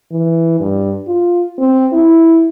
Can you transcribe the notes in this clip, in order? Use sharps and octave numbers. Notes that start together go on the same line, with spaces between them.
E3
G2
F4
C4
E4